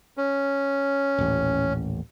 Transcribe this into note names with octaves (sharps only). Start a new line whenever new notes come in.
C#4
D#1 A1